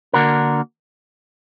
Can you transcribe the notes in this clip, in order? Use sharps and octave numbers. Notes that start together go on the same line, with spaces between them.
D3 A#3 D4 F#4 A#4